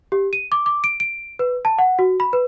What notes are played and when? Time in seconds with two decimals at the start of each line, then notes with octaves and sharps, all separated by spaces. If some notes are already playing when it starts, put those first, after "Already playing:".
0.12 G4
0.33 D#7
0.52 D6
0.66 D6
0.84 D7
1.00 D7
1.39 B4
1.65 A5
1.78 F#5
1.99 F#4
2.20 B5
2.33 B4